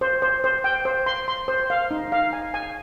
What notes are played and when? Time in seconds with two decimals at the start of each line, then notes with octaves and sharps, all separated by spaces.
0.01 C5
0.22 C5
0.44 C5
0.64 G5
0.85 C5
1.06 C6
1.28 C6
1.48 C5
1.70 F5
1.91 D#4
2.12 F5
2.33 G#5
2.54 G#5